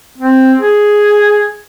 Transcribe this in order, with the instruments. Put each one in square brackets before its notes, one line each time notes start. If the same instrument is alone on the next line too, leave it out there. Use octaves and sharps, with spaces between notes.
[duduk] C4
G#4